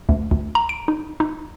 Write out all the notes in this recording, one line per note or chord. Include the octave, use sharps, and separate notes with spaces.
D2
D2
A#5
D7
D#4
D#4